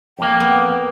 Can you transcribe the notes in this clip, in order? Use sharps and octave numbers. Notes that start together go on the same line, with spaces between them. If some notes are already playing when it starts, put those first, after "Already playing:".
F2 A#3 G5
B3